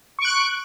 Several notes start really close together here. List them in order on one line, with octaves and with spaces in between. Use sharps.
C#6 D7 F#6